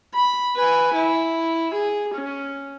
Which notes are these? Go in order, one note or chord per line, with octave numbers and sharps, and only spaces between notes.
B5
B4 G#5
E4
G#4
C#4